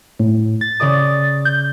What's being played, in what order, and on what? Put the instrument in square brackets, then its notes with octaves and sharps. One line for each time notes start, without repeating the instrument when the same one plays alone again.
[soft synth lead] A2
A6
[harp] C#3 D5 D#6
[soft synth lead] G6